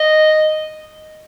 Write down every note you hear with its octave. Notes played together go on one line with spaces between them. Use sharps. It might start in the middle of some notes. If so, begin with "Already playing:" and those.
Already playing: D#5